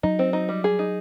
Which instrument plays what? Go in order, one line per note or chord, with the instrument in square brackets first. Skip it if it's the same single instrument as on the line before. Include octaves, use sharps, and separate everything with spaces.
[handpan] F#3 [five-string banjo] D#4
[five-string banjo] C4
D#4
G3
G#4
D#4